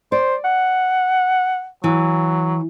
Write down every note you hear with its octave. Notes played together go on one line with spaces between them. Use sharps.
C5 D5
F#5
E3 F#3